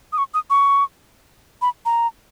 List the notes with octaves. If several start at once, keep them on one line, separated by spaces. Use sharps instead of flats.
D#6
C#6
D#6
C#6
B5
A#5